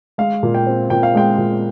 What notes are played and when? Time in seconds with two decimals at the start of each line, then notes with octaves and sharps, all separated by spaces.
0.18 G#3 F5
0.43 A#2
0.55 G5
0.66 C4
0.90 A#2 G5
1.03 F5
1.15 G#3 G5
1.38 A#2